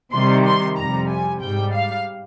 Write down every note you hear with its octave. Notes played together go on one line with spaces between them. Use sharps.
C3 D#3 G3 C6
C6
F2 C3 G3 A#5
G#5
G#2 G3 G5
F5